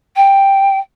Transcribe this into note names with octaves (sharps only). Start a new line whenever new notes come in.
G5